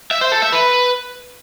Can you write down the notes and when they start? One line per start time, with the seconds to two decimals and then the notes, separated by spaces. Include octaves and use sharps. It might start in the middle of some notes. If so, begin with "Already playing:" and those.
0.11 E5
0.21 C5
0.32 A4
0.42 E5
0.52 B4